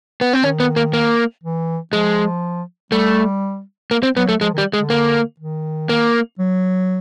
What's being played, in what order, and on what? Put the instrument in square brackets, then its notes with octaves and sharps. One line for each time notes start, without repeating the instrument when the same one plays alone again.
[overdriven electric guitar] B3
C4
[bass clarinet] D#3 [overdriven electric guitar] C#4
[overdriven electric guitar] B3
A#3
A#3
[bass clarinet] E3
[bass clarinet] F3 [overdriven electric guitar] G#3
[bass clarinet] G3 [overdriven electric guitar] A3
[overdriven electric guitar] A#3
C4
[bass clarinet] F#3 [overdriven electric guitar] B3
[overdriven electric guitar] A3
[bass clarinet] F3 [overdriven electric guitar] G#3
[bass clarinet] D#3
[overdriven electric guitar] G3
G#3
[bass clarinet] D3
[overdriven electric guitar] A#3
[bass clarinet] D#3
[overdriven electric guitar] A#3
[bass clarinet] F#3